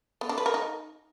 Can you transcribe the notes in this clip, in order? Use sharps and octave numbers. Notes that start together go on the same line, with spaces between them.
B3
D4
B4
A#4
D#4